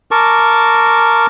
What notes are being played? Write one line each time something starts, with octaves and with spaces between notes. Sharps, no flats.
A#4 A5 C#6 D6